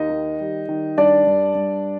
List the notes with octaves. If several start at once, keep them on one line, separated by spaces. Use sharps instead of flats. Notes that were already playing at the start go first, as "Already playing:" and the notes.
Already playing: D#2 D#4 D#5
D#3
G3
D#3
G2 D4 D5
G2
G2